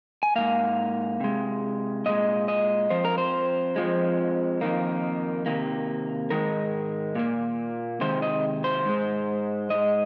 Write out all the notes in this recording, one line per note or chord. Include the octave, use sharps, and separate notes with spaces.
G#5
G#2 D#3 A#3 F5
C3 G#3
A#2 G#3 D#5
D#5
F2 F3 C5
A#4
C5
F2 F3 G#3
F2 D#3 A#3
C3 D#3 A#3
G#2 D#3 G#3 A#4
A#2 A#3
C3 D#3 G#3 C5
D#5
C5
G#2 G#3
G#2 G#3 D#5